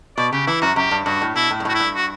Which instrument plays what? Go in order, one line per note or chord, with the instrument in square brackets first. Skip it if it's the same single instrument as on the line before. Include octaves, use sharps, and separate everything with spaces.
[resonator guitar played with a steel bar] B2 [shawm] D5
[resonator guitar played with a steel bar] C#3 [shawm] G4
[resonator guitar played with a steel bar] E3 [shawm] E4
[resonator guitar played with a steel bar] F#2 [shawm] F#4
[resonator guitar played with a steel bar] F#2 [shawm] G4
[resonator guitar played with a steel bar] G2
[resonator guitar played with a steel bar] G2 [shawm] F#4
[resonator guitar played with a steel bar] A2
[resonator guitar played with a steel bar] B2 [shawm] E4
[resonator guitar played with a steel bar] A2
G2
[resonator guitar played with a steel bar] A2 [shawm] F#4
[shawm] E4
[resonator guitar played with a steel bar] G2
[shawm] F#4